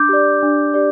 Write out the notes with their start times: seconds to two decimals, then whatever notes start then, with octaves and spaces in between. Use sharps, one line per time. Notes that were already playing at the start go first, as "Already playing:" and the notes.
Already playing: D4 D6 G6
0.09 G4 D5
0.42 D4
0.74 G4 D5